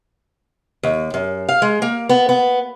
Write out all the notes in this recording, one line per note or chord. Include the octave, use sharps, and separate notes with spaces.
D#2
F#2
F5
G#3
A#3
B3
B3